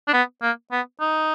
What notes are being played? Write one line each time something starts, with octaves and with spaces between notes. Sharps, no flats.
D4
B3
A#3
B3
D#4